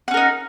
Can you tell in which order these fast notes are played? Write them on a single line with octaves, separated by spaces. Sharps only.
F#5 C#4 A#4 D#4